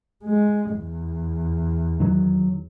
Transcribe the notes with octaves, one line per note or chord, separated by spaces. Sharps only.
G#3
E2
D#3 F#3